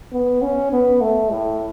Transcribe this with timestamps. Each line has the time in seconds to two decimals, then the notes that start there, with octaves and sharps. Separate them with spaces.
0.13 B3
0.42 C#4
0.72 B3
1.01 A3
1.31 A2